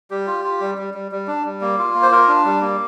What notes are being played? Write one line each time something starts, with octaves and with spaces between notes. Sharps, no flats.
G3 G4
F4
F4
G3
G3
G3
G3
D4
G3
A#3
F4
A#3
C5
F4 A#4
D4
G3
A#3